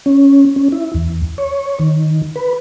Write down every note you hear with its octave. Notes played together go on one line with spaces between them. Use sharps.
C#4
C#4
E4
E2
C#5
D#3
B4